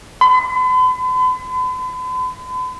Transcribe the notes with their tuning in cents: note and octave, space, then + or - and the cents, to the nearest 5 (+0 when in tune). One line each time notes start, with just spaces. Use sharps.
B5 +45